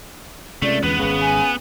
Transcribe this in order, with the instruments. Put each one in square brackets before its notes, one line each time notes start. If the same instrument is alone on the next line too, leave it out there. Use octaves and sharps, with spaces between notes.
[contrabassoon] C#2 [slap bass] C3 [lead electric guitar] A3 [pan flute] D5
[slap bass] E2 D3 [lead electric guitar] B3 [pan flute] B4
[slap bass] G#1 G#3 [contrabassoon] C#3
[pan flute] G#5